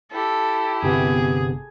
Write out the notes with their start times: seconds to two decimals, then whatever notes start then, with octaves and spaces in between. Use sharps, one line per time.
0.12 E4 G4 A4
0.83 G1 C3 B3 G#4